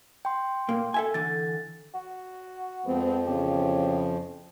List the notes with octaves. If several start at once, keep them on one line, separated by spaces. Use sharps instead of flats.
G5 C6
A#2 A#3
A4 E5 G#5
D3 E3 A6
F#4
F2 F3 G#3 B3 C4
E2 C#3 G4